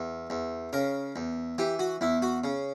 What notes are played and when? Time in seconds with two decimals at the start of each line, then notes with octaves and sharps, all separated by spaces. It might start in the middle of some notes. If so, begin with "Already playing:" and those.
Already playing: E2
0.30 E2
0.73 C#3 A#4
1.16 E2
1.58 E3 G4
1.79 F#4
2.01 E2 E4
2.22 F#4
2.44 C#3